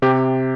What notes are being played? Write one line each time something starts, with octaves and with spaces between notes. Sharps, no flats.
C3 G4